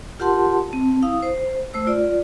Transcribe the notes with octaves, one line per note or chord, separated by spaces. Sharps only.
F4 G4 A#4 F#5 A5 C6
C4 A5
E4 F5 D#6
C5
A3 C5 E6
F4 D5